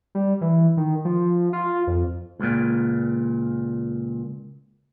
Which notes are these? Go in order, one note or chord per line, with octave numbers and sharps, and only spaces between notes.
G3
E3
D#3
F3
F4
F2
C#2 A#2